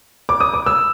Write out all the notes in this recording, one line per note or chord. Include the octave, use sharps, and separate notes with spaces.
D6
D#6
D6
E6